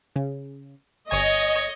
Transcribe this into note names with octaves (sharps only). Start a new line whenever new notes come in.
C#3
G1 C#5 D#5 G#5